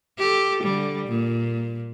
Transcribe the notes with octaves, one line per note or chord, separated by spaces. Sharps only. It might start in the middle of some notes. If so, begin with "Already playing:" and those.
G4 A4
D3 G3
A#2